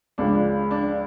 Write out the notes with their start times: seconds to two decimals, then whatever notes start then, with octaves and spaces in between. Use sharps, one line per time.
0.18 C#2 C#3 F3 D4
0.71 D4